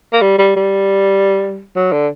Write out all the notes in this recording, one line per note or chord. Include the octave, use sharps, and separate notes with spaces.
A#3
G3
G3
G3
F#3
D3